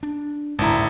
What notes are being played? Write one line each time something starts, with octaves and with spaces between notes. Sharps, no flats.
D4
D1 G#1 C#2 F#2 E4 A5 A#5